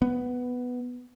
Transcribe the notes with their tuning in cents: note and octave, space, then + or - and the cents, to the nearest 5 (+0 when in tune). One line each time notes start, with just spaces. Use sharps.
B3 +5